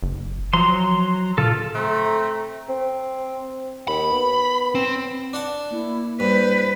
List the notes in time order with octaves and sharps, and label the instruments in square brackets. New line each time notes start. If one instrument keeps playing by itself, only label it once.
[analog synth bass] F#1
[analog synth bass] F3 [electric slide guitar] F#3 A#5 [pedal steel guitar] C6
[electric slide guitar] A#2 F4 [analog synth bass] D3 [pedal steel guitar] A4
[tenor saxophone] A3 [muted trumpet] C4 [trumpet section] A#5
[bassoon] C4
[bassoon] D#2 [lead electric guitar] B5
[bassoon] B3
[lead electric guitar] C4
[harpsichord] D4 F#5 A5
[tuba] A#3 [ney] E4
[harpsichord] G2 [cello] B4 [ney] C5